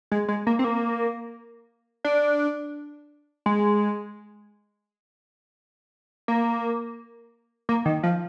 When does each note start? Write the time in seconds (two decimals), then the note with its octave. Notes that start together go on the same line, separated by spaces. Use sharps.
0.12 G#3
0.28 G#3
0.47 A#3
0.59 C4
0.64 A#3
2.04 D4
3.46 G#3
6.28 A#3
7.69 A#3
7.86 D#3
8.03 F3